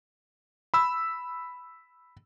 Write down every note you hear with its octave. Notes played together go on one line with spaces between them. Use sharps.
B5 E6